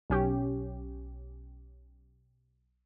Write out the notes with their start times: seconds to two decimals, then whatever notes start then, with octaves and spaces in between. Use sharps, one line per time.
0.10 B1 C#4 G4